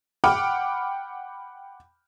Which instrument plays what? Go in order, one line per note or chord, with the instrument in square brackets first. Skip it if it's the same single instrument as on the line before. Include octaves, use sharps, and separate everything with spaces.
[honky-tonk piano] F#5 G5 B5 D6 F6